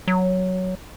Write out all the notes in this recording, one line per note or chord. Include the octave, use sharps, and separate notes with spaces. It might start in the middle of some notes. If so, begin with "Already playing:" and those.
F#3